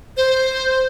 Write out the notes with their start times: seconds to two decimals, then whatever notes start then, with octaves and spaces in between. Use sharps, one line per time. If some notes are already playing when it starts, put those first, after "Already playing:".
0.17 C5